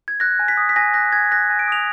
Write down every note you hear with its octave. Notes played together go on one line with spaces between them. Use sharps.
G#6
F#6 A#6
G#5
B6
D#6
B6
G#5 A#6
F#6 A#6
G#5 G#6
F#6 A#6
G#5
D7
D#6 F7